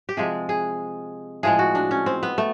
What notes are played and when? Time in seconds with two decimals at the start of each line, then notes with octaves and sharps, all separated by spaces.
0.09 G4
0.17 C3 F3 G#3 G#4
0.49 G#4
1.43 A2 F3 G#3 G#4
1.59 F#4
1.75 D4
1.91 C#4
2.06 C4
2.23 B3
2.38 A3